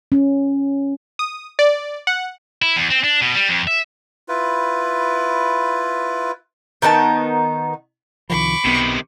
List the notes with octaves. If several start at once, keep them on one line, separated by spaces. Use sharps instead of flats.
C#4
D#6
D5
F#5
E4
E2
C4
D4
B2
G3
F2
E5
E4 F4 B4
D#3 B3 D#4 A5
C2 D#3 F3 B5 C#6 D6
B1 C3 D#3 B3